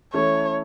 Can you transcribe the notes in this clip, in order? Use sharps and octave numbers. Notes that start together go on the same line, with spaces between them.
E3 A3 C#4 E4 A4 C#5